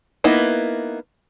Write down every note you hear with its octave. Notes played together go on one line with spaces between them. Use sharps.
A#3 B3 D#4 E4